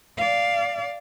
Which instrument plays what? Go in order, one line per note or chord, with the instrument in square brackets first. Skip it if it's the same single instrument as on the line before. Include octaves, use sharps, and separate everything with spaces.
[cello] D5 F5